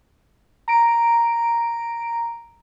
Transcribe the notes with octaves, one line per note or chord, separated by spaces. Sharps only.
A#5 D7